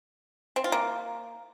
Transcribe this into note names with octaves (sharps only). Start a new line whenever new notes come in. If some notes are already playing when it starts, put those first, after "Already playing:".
C4
F4
A#3